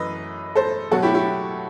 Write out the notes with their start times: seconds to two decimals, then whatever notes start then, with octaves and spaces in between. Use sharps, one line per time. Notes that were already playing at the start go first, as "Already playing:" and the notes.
Already playing: F#2 E3 A3 B4 D#5
0.55 A4 C5
0.91 B2 F#3 A3 F#4 A4
1.02 E4 G4
1.14 E4 G4